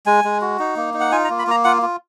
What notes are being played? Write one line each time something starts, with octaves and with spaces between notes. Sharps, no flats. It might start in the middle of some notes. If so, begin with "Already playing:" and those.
G#3 G#5
G#3
F#4
D#4
A#3
D#4
F#5
F4 G#5
A#5
A#3
B5
A#3 A#5
F4 F#5
F4